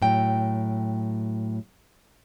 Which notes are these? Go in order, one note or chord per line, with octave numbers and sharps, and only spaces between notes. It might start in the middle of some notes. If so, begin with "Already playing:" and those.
A2 F#3 G5